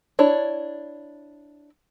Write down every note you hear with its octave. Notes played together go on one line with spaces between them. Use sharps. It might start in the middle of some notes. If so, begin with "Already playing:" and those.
D4 E4 C#5